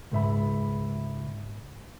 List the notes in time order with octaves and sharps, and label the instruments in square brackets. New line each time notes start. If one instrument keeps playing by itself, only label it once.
[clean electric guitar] C#2 G#2 E5 B5